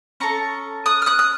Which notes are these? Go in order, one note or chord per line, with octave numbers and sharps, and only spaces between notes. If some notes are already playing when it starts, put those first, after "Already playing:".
C#4 A4 A#5 C#6
D#6 F#6
F6
D#6 F#6
D#6